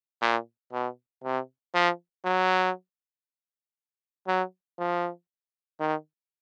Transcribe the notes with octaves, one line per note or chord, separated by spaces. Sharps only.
A#2
B2
C3
F3
F#3
F#3
F3
D#3